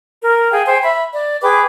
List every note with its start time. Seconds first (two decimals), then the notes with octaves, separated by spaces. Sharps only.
0.23 A#4
0.52 G#4 F5 G5
0.66 C5 G5 G#5
0.82 E5 B5
1.12 D5
1.42 G#4 B4 G5 D6